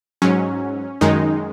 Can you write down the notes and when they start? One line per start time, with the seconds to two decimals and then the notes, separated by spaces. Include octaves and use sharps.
0.22 G#2 F#3 C#4
1.01 F#2 D#3 G#3 D#4